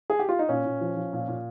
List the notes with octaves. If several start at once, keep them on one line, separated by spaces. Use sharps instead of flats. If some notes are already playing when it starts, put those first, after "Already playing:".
G#4
G4
F4
D#4
A#2 C#4
A#2
F3
F3
A#2
A#2